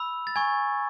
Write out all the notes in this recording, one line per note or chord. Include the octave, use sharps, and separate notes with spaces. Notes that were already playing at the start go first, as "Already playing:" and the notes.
Already playing: B5 E6
A6
G#5 C#6 G#6